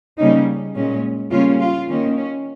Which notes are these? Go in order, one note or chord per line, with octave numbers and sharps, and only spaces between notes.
C#3 G3 A#3 C#4 D#4
A#2 G#3 C#4
C#3 G3 A#3 C#4 F4
F4
D#3 A#3 C#4
C#4